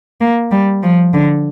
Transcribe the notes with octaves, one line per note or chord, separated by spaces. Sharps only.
A#3
G3
F3
D3